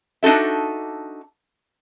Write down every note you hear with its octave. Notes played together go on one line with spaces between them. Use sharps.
D4 D#4 F#4 A4 E5